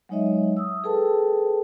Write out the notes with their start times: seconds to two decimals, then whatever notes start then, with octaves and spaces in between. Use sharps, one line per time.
0.09 F#3 G#3 D#4 C#5 D#5 E5
0.57 D#6 E6
0.84 G#4 A4 B4 G5 A5